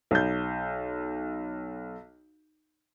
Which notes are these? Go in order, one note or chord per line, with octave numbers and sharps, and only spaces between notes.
B1 G6